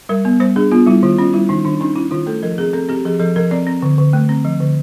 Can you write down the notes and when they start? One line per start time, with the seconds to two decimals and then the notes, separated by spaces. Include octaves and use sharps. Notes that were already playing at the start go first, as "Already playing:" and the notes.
0.09 G3 A#4
0.25 B3
0.40 G3 C5
0.56 D4 G#4
0.72 B3 F4
0.87 G3 E4
1.03 D#3 F4
1.18 C#4 F4
1.33 G3 E4
1.49 D#3 D#4
1.65 D#3 D4
1.80 C#4 D#4
1.96 C#4 E4
2.11 D#3 F4
2.26 A3 A4
2.43 F3 A#4
2.58 C4 G#4
2.73 C4 A4
2.89 C4 G4
3.05 F3 G#4
3.20 F3 A4
3.36 F3 A#4
3.51 C4 D5
3.67 C4
3.82 D3
3.98 D3
4.13 A3
4.29 C4
4.45 F3
4.60 D3